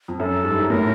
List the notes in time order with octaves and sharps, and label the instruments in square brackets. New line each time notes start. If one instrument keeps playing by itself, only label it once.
[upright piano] F2
[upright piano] F#2 [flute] A4
[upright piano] G#2
G2
G#2
[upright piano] A2 [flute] A#4